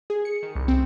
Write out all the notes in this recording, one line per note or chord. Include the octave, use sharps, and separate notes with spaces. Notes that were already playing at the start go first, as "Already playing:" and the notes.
G#4
C#7
D#3
C2
C4